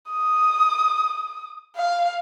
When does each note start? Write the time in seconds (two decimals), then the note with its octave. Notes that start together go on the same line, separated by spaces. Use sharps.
0.11 D#6
1.76 F5